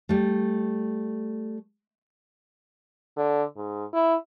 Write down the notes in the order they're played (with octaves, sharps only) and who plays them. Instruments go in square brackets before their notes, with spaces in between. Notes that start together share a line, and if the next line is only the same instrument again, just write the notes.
[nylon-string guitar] G3 A3
[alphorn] D3
G#2
E4